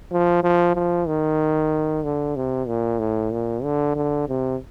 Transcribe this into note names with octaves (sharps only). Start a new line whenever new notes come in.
F3
F3
F3
D#3
D3
C3
A#2
A2
A#2
D3
D3
C3